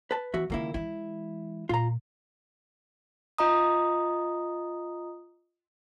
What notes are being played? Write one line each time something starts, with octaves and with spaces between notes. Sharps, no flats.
B4 A5
E2 E3 F#4 E5
C#2 D#3 G3 A#3 E4
E3 G#3 E4
A#2 F4 A#5
F4 D#5 A#5 D#6